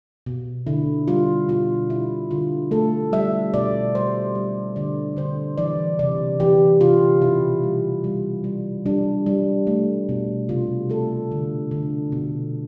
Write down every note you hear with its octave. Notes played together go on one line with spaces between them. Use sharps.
B2
D3 E4
G3 F4
B2 F4
B2 E4
D3 F4
A3 A4
G3 E5
B2 D5
G3 C5
G3
D3 D5
D3 C5
E3 D5
C3 D5
E3 G4
C3 F4
B2 E4
G3
G3
G3
G3 D4
G3
A3
B2
C3 F4
A3 A4
D3
D3
B2